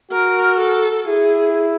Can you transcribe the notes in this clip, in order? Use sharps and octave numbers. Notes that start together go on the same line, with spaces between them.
F#4 A#4
A4
E4 G#4